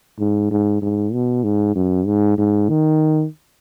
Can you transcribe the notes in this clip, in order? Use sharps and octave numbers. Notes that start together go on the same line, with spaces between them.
G#2
G#2
G#2
B2
G#2
F#2
G#2
G#2
D#3